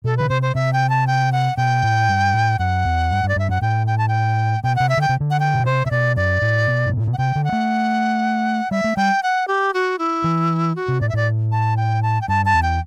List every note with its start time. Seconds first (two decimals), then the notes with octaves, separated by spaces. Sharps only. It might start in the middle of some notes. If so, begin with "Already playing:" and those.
0.04 B2 A4
0.17 D3 B4
0.29 C3 C5
0.42 C5
0.55 C3 E5
0.73 G5
0.89 A5
1.07 G5
1.32 F#5
1.57 B2 G5
1.83 A2
2.09 G2
2.34 A2
2.59 F#2 F#5
2.85 E2
3.10 G2
3.23 G2
3.28 D5
3.36 G2 E5
3.49 F#2 F#5
3.62 A2 G5
3.87 G5
3.98 A5
4.08 G5
4.64 B2 G5
4.76 C3 F#5
4.89 E5
4.97 D3 G5
5.09 C3
5.20 D3
5.30 F#5
5.40 G5
5.54 B2
5.65 C3 C5
5.86 C3 E5
5.91 B2 D5
6.16 F#2 D5
6.42 A2
6.68 B2
6.86 G2
6.97 A2
7.07 B2
7.13 F#5
7.18 C3 G5
7.35 D3
7.44 F#5
7.52 A3
8.71 G3 E5
8.84 A3
8.97 G3 G5
9.23 F#5
9.48 G4
9.74 F#4
9.99 E4
10.24 E3
10.76 F#4
10.88 C3
11.01 A2 D5
11.09 E5
11.13 A2 D5
11.52 A5
11.77 G5
12.03 A5
12.21 G5
12.28 G2 A5
12.45 A5
12.54 E2
12.63 G5